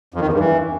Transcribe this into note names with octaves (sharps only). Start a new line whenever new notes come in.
F2
D#3
E2
G2
E3